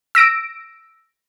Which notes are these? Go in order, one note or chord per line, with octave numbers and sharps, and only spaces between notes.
E6 A#6 D7